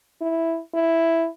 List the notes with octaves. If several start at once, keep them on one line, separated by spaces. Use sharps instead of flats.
E4
E4